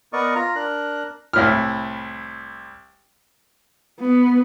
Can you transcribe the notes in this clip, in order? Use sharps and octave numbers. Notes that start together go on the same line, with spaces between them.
B3 A#4 D5 D#5 C#6
F4 A#5
D4 A#4 F#6
C2 A2 F6
B3